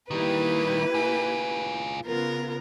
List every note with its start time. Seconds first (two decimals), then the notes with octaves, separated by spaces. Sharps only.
0.11 D#3 G3 A#3 E4 G4 B4
0.95 F4 G#4
2.05 C#3 B3 F4 A#4